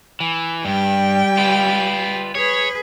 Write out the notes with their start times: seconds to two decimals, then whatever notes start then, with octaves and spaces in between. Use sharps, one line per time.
0.20 E3
0.65 G2 G3 G5
1.37 F4 B4
2.35 G#4 B4 C#5